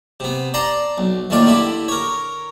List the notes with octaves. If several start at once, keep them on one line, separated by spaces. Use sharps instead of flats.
C3 B3
D5 A5 A#5 C6
B1
D#2 A2 D#3 F4 D5
D3 E4 G4
A#4 C#5